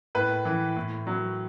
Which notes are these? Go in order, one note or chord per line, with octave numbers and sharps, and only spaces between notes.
A2 B4
E3
A2
F#3